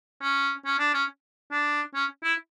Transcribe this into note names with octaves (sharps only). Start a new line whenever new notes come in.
C#4
C#4
D4
C#4
D4
C#4
E4